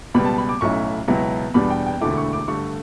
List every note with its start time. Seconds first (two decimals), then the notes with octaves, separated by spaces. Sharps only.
0.14 C#2 B2 G3 B3 B5
0.25 A5
0.38 B5
0.49 D6
0.61 B1 A2 F#3 C#4 E4 C#6
1.08 C#2 B2 F#3 B3 E4
1.54 E2 B2 G3 D4 B5
1.70 G5
1.86 G5
2.01 E1 D2 D3 A3 E4 D6
2.17 C#6
2.33 D6
2.48 G2 D3 A3 C#6